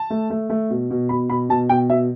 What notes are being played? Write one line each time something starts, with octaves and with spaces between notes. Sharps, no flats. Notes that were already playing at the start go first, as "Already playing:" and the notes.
Already playing: A5
A3
A3
A3
B2
B2
B2 B5
B2 B5
B2 A5
B2 G5
B2 E5